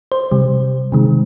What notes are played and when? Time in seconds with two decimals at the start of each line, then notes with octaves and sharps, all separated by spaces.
0.12 C5
0.31 C3 G3
0.92 C3 D#3 G#3